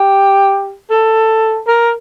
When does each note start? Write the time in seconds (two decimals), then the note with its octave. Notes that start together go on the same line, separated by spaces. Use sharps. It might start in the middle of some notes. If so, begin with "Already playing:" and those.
Already playing: G4
0.90 A4
1.68 A#4